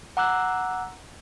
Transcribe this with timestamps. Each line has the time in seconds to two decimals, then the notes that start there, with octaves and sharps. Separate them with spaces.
0.17 F#5 A#5 D6 E6 F#6